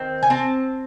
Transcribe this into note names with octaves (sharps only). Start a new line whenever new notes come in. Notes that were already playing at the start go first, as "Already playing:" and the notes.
Already playing: D#3 C4
G#5
C4 A5